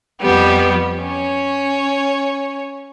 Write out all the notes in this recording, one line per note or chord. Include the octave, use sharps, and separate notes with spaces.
F2 F3 G3 B3 G4
C#4 C#5